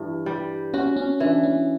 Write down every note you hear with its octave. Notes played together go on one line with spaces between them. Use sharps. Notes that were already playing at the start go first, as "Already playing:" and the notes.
Already playing: G2 E3
G3
C#4 F#4
C#4
E3 D4
C#4